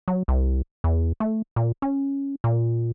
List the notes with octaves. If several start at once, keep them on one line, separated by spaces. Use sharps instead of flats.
F#3
C2
E2
A3
A#2
C#4
A#2